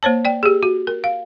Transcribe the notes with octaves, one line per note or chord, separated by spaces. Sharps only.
A#3 C5 C#5 A5
D5 G5
G4 G#4
F#4
A#4
F5